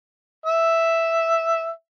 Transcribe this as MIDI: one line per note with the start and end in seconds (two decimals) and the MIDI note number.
0.46 1.70 76